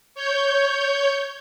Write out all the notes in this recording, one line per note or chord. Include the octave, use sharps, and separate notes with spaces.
C#5 G6